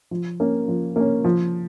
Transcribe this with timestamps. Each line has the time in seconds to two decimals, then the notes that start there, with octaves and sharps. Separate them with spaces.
0.11 F3
0.40 A#3 C#4
0.68 F3
0.96 A#3 C#4
1.24 F3